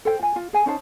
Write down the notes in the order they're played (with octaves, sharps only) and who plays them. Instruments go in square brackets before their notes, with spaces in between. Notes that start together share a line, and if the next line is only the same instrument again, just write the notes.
[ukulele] A4 C5 G5
F4 G#5
F4
G#4 G#5
C#4 D#4 C5 A5